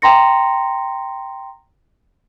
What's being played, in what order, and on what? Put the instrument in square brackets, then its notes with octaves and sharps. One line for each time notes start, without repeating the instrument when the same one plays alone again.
[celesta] G5 A#5 C6 A#6 C#7